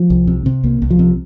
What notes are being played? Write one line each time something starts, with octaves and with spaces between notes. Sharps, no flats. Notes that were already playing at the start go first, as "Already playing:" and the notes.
Already playing: F3
C2
C3
C3
C2 A#3
C2
F3
C3